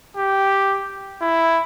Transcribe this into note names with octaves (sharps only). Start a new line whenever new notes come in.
G4
E4